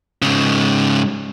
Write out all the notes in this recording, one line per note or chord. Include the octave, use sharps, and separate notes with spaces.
G#2 C#3